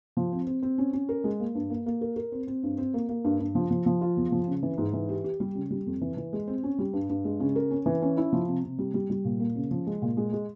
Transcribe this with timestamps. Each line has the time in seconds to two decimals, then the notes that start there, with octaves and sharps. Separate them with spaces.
0.17 F3
0.32 C4
0.47 C4
0.62 C4
0.78 C#4
0.93 C#4
1.09 A#4
1.24 G#3
1.40 A#3
1.55 G2
1.70 A#3
1.86 A#3
2.01 A#4
2.16 A#4
2.32 C4
2.47 C4
2.63 G2
2.78 C4
2.94 A#3
3.09 A#3
3.24 G2
3.40 G2
3.55 F3
3.70 F3
3.86 F3
4.01 F4
4.17 E2
4.32 F3
4.48 C#3
4.63 E3
4.78 G#2
4.93 E3
5.09 G4
5.24 G4
5.40 G3
5.55 C#3
5.71 G3
5.86 F2
6.01 E3
6.17 E3
6.33 G#3
6.47 C4
6.63 C#4
6.79 G3
6.93 G2
7.09 G2
7.25 G#3
7.40 C#3
7.56 A#4
7.71 C#4
7.86 E3
8.02 C#4
8.17 E4
8.33 F3
8.48 C3
8.63 C3
8.78 G3
8.94 G3
9.10 G3
9.25 A#2
9.40 A#3
9.55 C#3
9.71 F3
9.87 G#3
10.02 A#2
10.17 G#3
10.33 G#3